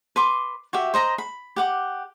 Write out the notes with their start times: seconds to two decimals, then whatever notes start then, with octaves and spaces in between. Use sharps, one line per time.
0.16 B4 C6 D6
0.73 F#4 G4 E5
0.94 C5 D#5 A#5
1.18 B5
1.56 G4 F#5 D6